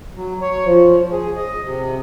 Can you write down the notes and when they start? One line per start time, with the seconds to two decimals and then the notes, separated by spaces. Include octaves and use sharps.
0.16 F#3
0.41 C#5
0.66 F3
1.12 G#4
1.36 D#5
1.65 C3